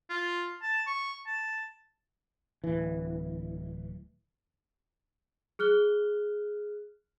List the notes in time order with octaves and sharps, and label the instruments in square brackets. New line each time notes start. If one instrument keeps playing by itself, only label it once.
[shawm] F4
A5
C#6
A5
[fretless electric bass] D1 E3
[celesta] G#4 F6 F#6 G7